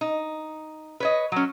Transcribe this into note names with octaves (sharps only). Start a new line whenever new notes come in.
D#4
B4 C#5 D#5
F#3 C#4